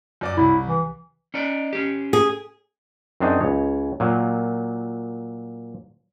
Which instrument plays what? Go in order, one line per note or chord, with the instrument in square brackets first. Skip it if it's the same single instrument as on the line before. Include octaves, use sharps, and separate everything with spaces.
[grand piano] F#2 D5 D6
[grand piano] C2 [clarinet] E4
[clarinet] E3
[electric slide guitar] C#4 D#4 D5
C#4 G4
[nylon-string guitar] G#4
[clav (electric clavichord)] F#2 C4 D4 D#4 G#4
C#2 C#5
A#2 F#3